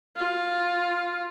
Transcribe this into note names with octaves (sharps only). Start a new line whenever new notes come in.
F4